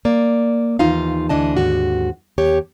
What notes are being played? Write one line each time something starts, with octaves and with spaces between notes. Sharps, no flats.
A#3 D5
D#2 E3 D#4 F4 F5
D2 E3 D4 D#5 A5
D#2 G#2 F#4
D#2 G4 C#5